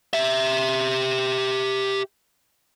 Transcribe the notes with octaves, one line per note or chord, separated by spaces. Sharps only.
G4 E5